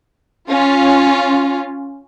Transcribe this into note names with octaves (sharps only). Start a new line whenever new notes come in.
C#4 F4